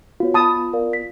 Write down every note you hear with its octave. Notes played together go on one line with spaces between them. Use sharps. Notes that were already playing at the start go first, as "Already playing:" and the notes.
B3 F4 F#4 C#5
A5 B5 D#6
A#4 D5 F5
B6